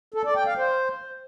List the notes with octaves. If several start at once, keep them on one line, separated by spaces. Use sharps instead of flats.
A4
D5
G5
F5
C5